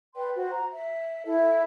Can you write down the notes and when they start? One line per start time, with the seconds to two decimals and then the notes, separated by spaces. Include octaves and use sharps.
0.15 B4 D5 G5 C6
0.35 F#4 C5
0.52 A#5
0.73 E5
1.26 E4 A4 E5